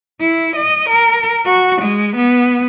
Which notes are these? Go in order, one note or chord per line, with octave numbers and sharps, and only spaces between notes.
E4
D#5
A#4
F#4
G#3
B3